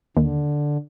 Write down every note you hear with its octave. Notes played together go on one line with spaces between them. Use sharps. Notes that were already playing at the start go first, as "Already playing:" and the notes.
D#2 D3